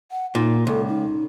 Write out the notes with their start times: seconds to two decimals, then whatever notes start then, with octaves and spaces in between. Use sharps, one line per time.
0.11 F#5
0.35 A#2 D#4
0.67 C#2 A4
0.88 D#4